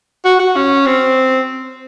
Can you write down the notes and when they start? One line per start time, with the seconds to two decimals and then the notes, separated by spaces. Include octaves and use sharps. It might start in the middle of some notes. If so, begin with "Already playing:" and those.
0.25 F#4
0.39 F#4
0.56 C#4
0.86 C4